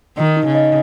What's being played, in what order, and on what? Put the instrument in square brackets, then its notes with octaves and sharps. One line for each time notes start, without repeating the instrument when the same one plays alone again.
[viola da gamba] D#3 [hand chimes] D#5
[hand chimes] D#4
[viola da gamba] C#3
[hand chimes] D#5